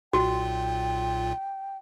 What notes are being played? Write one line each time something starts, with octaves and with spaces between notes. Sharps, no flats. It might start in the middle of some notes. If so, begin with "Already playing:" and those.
B1 A#2 F4 F#4 G5